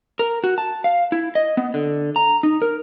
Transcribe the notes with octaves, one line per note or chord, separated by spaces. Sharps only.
A#4
F#4
A5
F5
E4
D#5
B3
D3
A#5
D#4
A#4